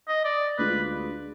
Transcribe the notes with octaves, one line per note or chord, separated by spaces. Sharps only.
D#5
D5
D2 D3 G#3 D4 F4 B4